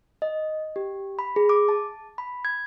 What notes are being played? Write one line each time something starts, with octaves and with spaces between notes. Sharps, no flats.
D#5
G4
B5
G#4
D6
A5
B5
G#6